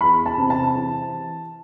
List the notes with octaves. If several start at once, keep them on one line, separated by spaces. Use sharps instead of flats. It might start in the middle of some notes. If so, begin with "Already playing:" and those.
E2 B5
A5
C3
A5
E3